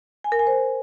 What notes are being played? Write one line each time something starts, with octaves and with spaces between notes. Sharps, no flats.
G#5
A#4
G#5
C5